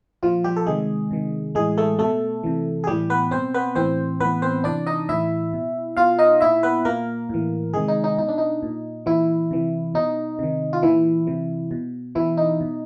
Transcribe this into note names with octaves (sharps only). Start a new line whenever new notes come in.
A#2 F3 F4
G3 G4
A4
C3 D#3 G#3 G#4
C3 D#3
A2 E3 G#3 G#4
A3 A4
B2 A3 A4
C3 E3
G#4
A2 E3 G3 G4
B3 B4
B2 C4 C5
B3 B4
A2 E3 C4 C5
A2 E3 B3 B4
C4 C5
C3 E3 D4 D5
D#4 D#5
A2 E3 E4 E5
B2
B2 F4 F5
D#4 D#5
A#2 E4 E5
B3 B4
A#2 A#3 A#4
A2 E3
C3 D#3 G#3 G#4
D#4
D#4
B2 D#4
D4
D#4
A#2
A#2 E3 E4
C3 E3
B2 D#4
C3 D#3
F4
A#2 E3 E4
C3 E3
B2
B2 E3 E4
D#4
B2